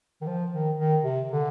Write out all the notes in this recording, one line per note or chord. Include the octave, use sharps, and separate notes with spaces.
D#3
F3
D#3
D#3
C3
D3